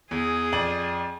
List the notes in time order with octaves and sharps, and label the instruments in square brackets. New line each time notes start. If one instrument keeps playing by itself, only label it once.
[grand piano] E2 [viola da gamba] G#4
[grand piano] F2 D5 F#7